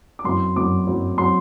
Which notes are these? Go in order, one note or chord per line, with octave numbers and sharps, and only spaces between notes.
D6
F#2 F#3 C4 E4 C6
F#2 F#3 C4 E4 D6
F#2 F#3 C4 E4
F#3 C4 E4 C6